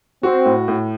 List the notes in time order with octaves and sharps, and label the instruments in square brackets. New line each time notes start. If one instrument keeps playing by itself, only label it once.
[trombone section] C4 [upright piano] F#4
[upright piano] A2
A2